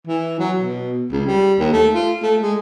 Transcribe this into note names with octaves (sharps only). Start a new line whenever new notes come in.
E3
F#3
B2
C#2
G3
D#2
A3
F4
A3
G#3